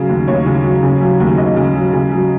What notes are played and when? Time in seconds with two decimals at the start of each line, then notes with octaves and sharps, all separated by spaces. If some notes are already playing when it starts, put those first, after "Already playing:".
Already playing: C#3 F#3 G#4
0.09 D#2
0.28 D#2 C#5
0.46 C#3
0.64 F#3
0.83 C#3
1.01 F#3
1.20 D#2
1.38 D#2 D#5
1.56 C#3
1.75 F#3
1.93 C#3
2.12 F#3